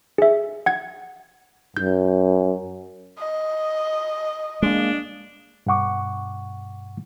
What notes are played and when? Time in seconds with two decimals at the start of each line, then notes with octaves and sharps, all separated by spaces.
0.18 G#4 E5
0.66 F#5 G#6
1.77 F#2 G6
3.19 D#5
4.62 G#3 A#3 D4
5.66 G2 B2 F#5 C#6 D6